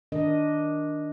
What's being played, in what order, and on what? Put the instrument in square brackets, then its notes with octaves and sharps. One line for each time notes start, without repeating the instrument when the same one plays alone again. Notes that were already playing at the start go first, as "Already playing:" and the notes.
[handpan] D#3 D4 A#4 D#5